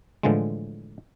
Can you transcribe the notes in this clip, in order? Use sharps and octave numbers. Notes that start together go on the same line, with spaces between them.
A2 D3 E3 F3 G#3